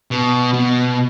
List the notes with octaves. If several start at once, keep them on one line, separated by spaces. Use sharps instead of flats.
B2
B2